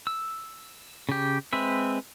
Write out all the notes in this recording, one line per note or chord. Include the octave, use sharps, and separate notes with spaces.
E6
C#3 G4
G#3 C4 B4 E5